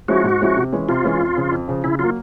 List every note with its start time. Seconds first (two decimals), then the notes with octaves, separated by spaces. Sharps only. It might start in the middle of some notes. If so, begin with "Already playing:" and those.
0.08 F3 G#3 C#4 E4 F#4
0.24 G#2
0.41 F3 G#3 C#4 E4
0.56 C3
0.72 E3 G#3 C#4
0.89 C3 F4
1.04 E3 G#3 C#4
1.20 F2
1.36 C#3 F3
1.51 F2
1.68 C#3 F3
1.84 C#3 E4
1.99 F#3 A#3 F4